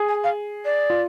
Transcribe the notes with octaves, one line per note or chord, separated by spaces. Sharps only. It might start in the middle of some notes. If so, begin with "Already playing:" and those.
Already playing: G#4
G#5
F5
D5
F4